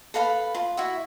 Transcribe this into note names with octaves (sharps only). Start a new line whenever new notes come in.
A4 B4 F5 B5
F4
E4 F#4 E5